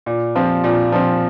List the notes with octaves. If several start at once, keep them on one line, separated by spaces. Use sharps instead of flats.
A#2
F3 C4
A#2
F3 C4